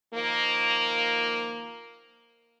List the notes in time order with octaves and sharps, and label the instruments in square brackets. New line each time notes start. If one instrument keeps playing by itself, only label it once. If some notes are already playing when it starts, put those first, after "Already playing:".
[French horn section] D#3 F3 A#3